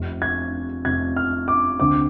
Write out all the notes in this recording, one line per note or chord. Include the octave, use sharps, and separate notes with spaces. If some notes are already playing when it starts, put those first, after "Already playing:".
Already playing: F1 F2 C3
G#6
F1 F2 C3 G#6
F6
D6
D2 D3 A3 C4 D6